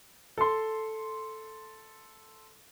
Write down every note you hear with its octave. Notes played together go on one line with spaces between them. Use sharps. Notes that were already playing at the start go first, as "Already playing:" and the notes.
A4 C6